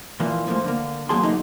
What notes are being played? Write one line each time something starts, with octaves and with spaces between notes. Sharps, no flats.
A#2 E3 F3 A#3
G#2 F3 A3 A#3
D3 A#3
D#2 F#3 A#3 G#4 A5 C6
D3 E3 F#3 A#3 D#4